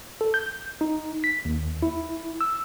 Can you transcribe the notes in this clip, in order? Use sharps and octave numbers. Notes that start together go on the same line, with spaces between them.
A4
G6
D#4
B6
D#2
E4
E6